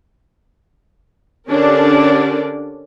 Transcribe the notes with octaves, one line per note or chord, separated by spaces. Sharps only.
D3 C#4 D4 G4 A#4 D5